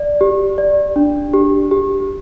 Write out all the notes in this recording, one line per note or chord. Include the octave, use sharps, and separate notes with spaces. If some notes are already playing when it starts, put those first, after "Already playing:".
Already playing: D5
G4
D5
D4
G4
G4